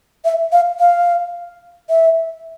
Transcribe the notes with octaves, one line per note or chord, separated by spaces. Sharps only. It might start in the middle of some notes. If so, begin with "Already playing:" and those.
E5
F5
F5
E5